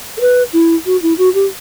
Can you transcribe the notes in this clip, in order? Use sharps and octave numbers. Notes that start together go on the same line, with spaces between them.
A4
B4
E4
F#4
E4
F#4
G4